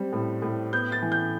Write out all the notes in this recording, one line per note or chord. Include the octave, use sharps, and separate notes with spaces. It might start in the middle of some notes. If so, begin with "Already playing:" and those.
Already playing: G3 C4
A2
A2
B3 G6
A6
E3
G6